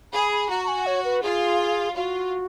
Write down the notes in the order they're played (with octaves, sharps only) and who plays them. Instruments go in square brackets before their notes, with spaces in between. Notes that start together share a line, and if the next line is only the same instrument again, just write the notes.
[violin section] G#4 [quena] B5
[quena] B5
[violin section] F#4 [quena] A#5
[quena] A#5
G#5
C#5
B4
[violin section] F4 [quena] G#4
[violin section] F4 [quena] F#4